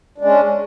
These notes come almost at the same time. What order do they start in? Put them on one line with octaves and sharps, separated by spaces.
D4 G#3 C#4